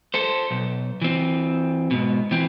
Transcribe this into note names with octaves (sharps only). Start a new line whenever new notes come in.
A4 C5
B1
E3 C4
G#2 B2
E3 C4